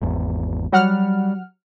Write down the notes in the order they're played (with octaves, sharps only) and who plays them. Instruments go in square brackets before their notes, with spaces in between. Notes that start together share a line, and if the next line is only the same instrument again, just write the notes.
[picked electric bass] G#1 E2
[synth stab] F#3 F#5 F6 [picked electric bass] G3